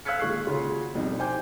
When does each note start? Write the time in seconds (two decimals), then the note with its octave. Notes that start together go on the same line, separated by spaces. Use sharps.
0.05 F5 E6 F#6 G#6 B6 C#7
0.20 A#2 D#3 G#3 C#6 F#6 C7
0.47 A#2 C#3 F4 F#4
0.94 F1 C2 B2 D#4
1.19 C5 G5 G#5 D6 G6